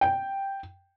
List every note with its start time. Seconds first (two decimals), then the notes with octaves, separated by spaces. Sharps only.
0.01 G5